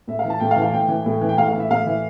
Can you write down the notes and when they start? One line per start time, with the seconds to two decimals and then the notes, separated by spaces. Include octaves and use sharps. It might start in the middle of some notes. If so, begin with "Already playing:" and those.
0.08 A2 E5
0.19 F5
0.25 E3
0.30 A5
0.40 A2 G5
0.51 F5
0.56 E3
0.62 F5
0.72 A2 G5
0.89 E3
1.06 A2
1.21 E3
1.29 G5
1.37 A2 F5
1.49 F5
1.54 E3
1.60 E5
1.71 A2 F5
1.86 E3 E5